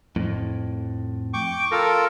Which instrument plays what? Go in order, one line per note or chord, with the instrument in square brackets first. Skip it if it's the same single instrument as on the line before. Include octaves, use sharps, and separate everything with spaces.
[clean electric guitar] F2 A2
[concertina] G5 C#6 D6
F4 A4 A#4